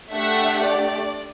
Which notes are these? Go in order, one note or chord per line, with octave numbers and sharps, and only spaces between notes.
A3 D4 G4 E5 F#5
D5